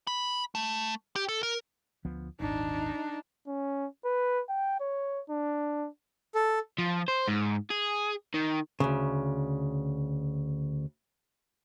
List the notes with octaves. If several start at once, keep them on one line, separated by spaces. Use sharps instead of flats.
B5
A3
G4
A4
A#4
D2 F3 B3
D#1 G#1 D4 D#4
C#4
B4
G5
C#5
D4
A4
F3
C5
G#2
G#4
D#3
D2 C#3